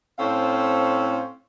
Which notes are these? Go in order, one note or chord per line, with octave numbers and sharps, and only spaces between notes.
A2 C4 C#4 A4 C5 F5